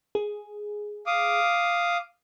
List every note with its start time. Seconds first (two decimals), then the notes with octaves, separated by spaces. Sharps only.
0.15 G#4
1.06 F5 D6 D#6